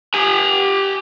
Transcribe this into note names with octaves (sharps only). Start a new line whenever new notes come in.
G4 G#5